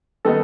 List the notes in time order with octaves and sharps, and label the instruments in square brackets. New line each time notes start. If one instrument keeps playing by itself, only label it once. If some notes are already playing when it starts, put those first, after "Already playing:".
[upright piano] D#3 G3 B3 D#4 [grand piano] A4